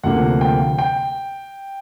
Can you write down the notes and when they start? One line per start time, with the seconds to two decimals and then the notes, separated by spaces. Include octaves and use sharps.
0.04 D2 C3 F3 A#3 F#5
0.41 G5
0.79 G5